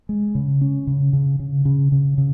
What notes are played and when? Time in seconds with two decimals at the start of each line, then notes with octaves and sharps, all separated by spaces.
0.09 G#3
0.35 C#3
0.61 C#4
0.87 C#3
1.13 C#3
1.39 C#3
1.65 C#3
1.92 C#3
2.18 C#3